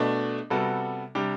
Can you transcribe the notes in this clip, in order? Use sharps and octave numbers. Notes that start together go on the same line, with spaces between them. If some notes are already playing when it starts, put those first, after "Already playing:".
Already playing: B2 A3 D4
C3 G3 B3 F#4 A4
C3 G3 D4 G4